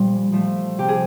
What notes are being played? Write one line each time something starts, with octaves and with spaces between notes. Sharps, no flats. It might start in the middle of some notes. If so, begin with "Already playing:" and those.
Already playing: A#2 F3 G3
F3 A3
C3 G4
G#4